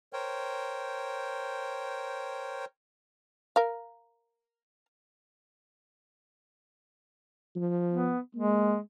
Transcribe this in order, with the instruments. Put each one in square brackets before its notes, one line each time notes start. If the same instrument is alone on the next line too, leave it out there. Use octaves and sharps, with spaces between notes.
[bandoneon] A#4 C5 C#5 G5
[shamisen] A#4 F5
[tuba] F3
[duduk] B3
[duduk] G#3 [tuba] A#3